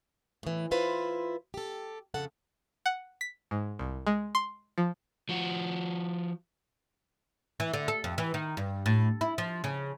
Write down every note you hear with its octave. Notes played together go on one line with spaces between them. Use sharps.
A2 E3
E4 F4 B4 C5
G4 A4
F2 C#3 A4 F#5
F#5
B6
G#2
C2
G#3
C6
F3
F3 F#4
E3
D3
A4
F2
E3
D#3
G2
A2
E4
F3
C#3